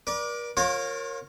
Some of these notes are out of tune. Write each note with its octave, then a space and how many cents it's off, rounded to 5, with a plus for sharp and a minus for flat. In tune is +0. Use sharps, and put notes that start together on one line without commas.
A#4 +45 D5 +0
F4 +40 A#4 +0 C#5 -25